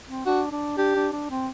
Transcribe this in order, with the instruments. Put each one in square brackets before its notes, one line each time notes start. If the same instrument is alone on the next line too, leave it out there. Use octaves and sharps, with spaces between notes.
[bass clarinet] C4
[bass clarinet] D4 [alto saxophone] F#4
[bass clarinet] D4
[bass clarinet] D4 [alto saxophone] G4
[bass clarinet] D4
D4
C4